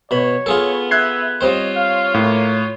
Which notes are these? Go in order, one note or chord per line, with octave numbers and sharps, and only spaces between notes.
B2 C#5 B5
B3 F4 G#4 A4
E5 F#6 G#6 C7
G3 C4 F4 C5 C#5 D#5
F5
A2 A#3